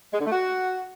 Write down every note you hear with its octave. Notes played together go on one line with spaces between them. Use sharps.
G#3
D3
A3
F#4